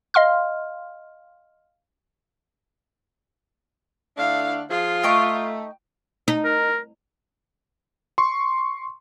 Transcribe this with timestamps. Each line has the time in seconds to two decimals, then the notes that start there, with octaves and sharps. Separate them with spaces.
0.14 D#5 F5 C6 F6
4.18 D3 A3 D4 E4 F5
4.70 F3 F4 G#4
5.03 A3 D#4 G5 C#6
6.28 D#4
6.45 A#4
8.18 C6 C#6